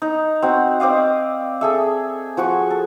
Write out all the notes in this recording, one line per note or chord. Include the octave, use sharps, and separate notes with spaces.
D#4
C4 F#4
C4 D5 D#5 F5
G#4 A4 E5
F3 F#4 C#6
A4